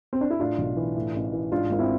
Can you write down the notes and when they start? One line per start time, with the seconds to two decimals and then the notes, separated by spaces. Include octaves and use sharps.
0.13 C4
0.21 D4
0.30 E4
0.39 A2 D4 F4
0.58 B1
0.77 E3
0.96 A2
1.15 A1
1.33 E3
1.52 G#2 D4 F4
1.70 G#1 F4
1.79 C4 E4